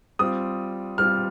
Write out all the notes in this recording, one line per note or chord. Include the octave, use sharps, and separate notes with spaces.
G3 C4 F4 D#6
G3 C4 F4 F6